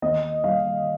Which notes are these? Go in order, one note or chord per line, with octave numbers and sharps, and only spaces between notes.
D#2 D#5
G3 F5